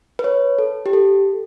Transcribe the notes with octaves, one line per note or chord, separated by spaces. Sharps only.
B4
C#5
A4
G4
A4